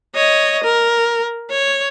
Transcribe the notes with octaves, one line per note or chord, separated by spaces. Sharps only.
C#5 D#5
A#4
C#5